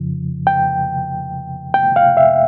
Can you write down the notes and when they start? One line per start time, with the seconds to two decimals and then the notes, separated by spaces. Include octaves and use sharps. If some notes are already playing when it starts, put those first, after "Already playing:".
Already playing: F2 C#3 F3
0.47 G5
1.74 G5
1.96 F5
2.17 E5